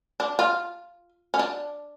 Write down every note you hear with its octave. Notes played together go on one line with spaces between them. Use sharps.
D4
F4
C#4
D4